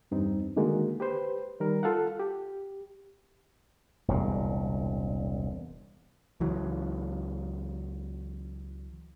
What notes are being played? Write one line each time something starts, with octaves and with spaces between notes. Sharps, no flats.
E2 G2 C4 D#4
D3 D#3 G#3 A#3 F#4
G4 B4 C5
D#3 G3 A#4
F4 A4 F5 F#5
G4
E1 C2 A#2
C#2 E3 F#3